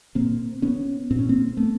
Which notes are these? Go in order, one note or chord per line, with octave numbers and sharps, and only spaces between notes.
A#2 A#3 C4
B3 C#4
A#2 C4
C#4
A#3 C4
A3 B3